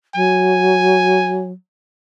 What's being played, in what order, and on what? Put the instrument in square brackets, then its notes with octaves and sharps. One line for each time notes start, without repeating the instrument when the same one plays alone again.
[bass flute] F#3 [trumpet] G#5